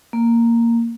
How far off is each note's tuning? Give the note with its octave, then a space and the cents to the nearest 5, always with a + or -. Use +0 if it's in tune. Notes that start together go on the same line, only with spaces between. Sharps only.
A#3 -5